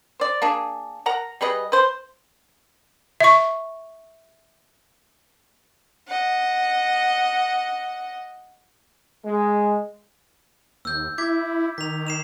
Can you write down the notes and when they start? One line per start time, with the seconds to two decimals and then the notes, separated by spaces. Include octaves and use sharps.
0.20 C5 D5
0.42 A#3 D4 G#4
1.06 A#4 F#5 A#5
1.41 G3 G#4 B4 D#5
1.72 B4 C5
3.20 E5 C#6
6.07 D#5 F#5
9.25 G#3
10.85 D#2 E6 G6
11.18 E4 D6 G#6 B6
11.78 D#3 B6 F7
12.07 C7 E7 F7